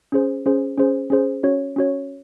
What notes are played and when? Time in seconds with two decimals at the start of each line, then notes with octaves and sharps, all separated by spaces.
0.12 C#4 G#4 C5
0.46 C#4 G#4 C5
0.78 C#4 G#4 C5
1.10 C#4 G#4 C5
1.43 C#4 F#4 C#5
1.76 C#4 F#4 C#5